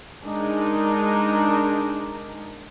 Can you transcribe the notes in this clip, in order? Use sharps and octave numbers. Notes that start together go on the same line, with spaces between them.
G#3 D4 D#4 A#4